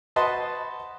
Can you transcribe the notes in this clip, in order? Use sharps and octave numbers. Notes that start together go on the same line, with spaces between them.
F#4 B4 C5 D#5 A5 C6